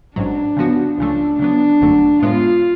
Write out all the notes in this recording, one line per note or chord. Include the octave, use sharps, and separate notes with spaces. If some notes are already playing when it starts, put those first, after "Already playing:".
A1 G#2 F#3 D4
C#3 F3 B3 F#4
C#2 C#3 F3 A3 D4
C#3 F#3 B3 D4
G#1 F#2 D3 F#3 A3
A2 G#3 B3 F4